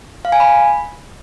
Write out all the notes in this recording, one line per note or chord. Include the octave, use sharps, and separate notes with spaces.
F5
G#5
B5